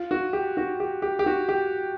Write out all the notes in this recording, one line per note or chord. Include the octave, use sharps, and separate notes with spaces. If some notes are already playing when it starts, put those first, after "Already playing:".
Already playing: F4
F#4
G4
F#4
G4
G4
G4
F#4
G4